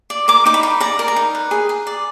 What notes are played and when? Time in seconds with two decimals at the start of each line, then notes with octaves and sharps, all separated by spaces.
0.10 D5
0.28 A#4 D6
0.46 D#4 D6
0.54 B5
0.63 D#4
0.80 D5 A#5
0.99 A#4
1.08 A#5
1.16 D#4
1.35 B4
1.51 G#4
1.69 G#4
1.87 D5